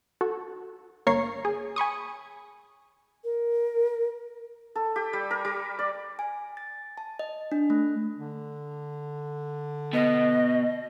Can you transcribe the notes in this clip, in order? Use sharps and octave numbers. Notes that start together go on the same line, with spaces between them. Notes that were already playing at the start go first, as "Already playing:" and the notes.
F#4 A4
G1 A#3 C#5 A#5 G#6 C7
G#4
G#5 B5 C#6 D#6
A#4
A4
G4
G3
A#4
G3
D5
G#5
A6
A5
D#5
D4
A3
D3
B2 D#5